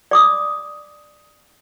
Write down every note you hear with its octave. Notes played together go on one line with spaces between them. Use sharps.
D5 D6 D#6